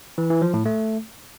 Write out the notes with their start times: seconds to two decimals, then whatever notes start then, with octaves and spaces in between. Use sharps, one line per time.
0.18 E3
0.30 E3
0.42 F3
0.54 A2
0.66 A3